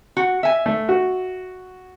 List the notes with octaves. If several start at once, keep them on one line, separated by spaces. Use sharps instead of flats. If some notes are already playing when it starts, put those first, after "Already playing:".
F#4
E5 G#5
A3
F#4